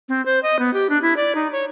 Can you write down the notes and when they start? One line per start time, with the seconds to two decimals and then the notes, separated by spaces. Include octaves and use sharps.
0.09 C4
0.26 C5
0.43 D#5
0.59 B3
0.74 G4
0.90 D4
1.02 E4
1.17 D5
1.35 D#4
1.52 C#5